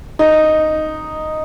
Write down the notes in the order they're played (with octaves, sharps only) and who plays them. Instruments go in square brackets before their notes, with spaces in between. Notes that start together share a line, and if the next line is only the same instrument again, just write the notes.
[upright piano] D#4